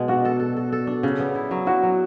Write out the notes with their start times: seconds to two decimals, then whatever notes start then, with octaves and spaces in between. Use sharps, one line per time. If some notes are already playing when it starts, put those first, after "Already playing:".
Already playing: B2 G#3
0.08 D4 F#4
0.25 A4
0.40 A4
0.57 A4
0.72 A4
0.87 D4
1.03 C#3
1.20 B3
1.35 E4
1.51 F#3
1.66 E4 F#4
1.83 F#3